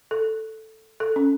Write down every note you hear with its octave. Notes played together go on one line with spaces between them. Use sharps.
A4
A4
C#4